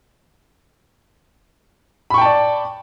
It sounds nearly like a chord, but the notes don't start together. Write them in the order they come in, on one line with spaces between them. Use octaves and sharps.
B5 C#6 G5 A5 D5